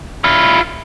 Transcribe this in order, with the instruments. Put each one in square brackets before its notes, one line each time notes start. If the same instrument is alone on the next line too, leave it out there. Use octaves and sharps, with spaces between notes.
[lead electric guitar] E4 F4